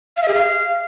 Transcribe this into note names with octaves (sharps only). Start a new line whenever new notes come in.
F5
E5
G#4
F5